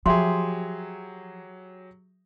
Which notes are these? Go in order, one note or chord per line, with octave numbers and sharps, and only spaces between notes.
F3 F#3 G4 G#4 E5 C6